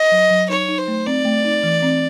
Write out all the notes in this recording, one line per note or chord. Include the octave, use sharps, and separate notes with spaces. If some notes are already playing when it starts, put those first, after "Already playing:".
Already playing: D#5
F#3
F#3
D#4 C#5
D#4
C5
A3
C4 D5
A3
D#4
E3
C4